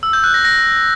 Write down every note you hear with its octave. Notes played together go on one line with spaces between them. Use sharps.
E6
G6
F#6
A#6
A#6